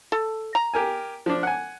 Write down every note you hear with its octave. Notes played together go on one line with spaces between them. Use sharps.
A4
A#5
G4 A#4 G#5
F3 D4
F#5 G#5